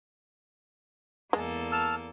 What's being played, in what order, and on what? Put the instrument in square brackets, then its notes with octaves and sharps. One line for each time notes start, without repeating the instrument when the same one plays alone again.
[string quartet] E2 A#3 A4 [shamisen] G#3
[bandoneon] A5 E6 F6